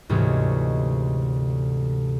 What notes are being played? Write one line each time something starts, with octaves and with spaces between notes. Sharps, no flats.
D2 G#2 C3 E3 G#3 C#4